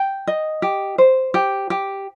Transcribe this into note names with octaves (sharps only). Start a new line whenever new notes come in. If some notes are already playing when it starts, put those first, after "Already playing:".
Already playing: G5
D#5
G4
C5
G4
G4